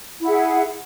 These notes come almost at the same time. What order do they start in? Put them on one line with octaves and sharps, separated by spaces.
E4 F#5 G#4